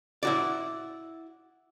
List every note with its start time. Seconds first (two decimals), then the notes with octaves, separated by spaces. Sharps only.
0.23 E4 F#4 D5